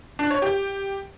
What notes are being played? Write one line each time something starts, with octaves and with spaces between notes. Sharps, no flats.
D4
C#5
G4